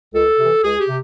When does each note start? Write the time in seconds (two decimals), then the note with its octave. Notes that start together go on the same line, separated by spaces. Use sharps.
0.14 C#2 A4
0.39 C3 E3
0.64 C#2 G#4
0.80 G4
0.88 C3